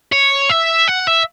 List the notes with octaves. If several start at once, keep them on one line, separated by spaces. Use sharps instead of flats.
C#5
E5
F#5
E5